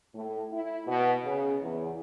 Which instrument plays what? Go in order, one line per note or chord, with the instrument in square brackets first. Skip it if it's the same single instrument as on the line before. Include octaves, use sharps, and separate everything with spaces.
[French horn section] A2
E4
B2
C#3
E2